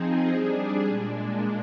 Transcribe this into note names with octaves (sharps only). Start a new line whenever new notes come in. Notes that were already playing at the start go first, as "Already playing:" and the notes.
Already playing: F3 C4 D#4 G#4
G3 D4 G#4
A#2 G#3 D4